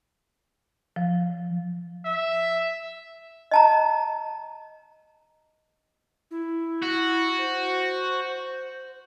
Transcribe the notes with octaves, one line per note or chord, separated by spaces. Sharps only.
F3
E5
D#5 A5 A#5
E4
F#4
C5